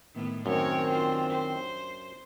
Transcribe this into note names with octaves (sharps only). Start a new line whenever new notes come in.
A2 D#3 B3
F#2 D#3 C4 A#4 C#5
D4 F4 C5
C5